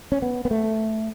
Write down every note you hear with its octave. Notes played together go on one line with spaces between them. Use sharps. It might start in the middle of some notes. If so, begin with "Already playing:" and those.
C#4
B3
B3
A3